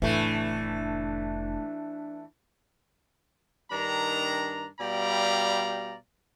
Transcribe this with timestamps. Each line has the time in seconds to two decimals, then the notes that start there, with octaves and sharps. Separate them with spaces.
0.02 F1 A2 E3 A3 D4 E4
3.71 G2 D#3 D4 A#5
4.80 B2 G3 D5 F5 G5 A#5